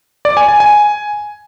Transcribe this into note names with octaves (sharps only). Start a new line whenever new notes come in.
D5
G#5
G#5
G#5